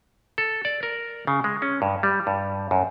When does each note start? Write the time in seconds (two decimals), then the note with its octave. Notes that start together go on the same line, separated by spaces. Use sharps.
0.38 A4
0.65 D5
0.83 A#4
1.27 C#3
1.44 G#3
1.62 C#4
1.82 G2
2.03 G3
2.27 G2
2.71 F#2